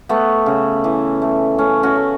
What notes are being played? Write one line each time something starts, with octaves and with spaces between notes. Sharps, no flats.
A3 B3
C#3
E3
A3
A3 C#4
C#4 F#4
A3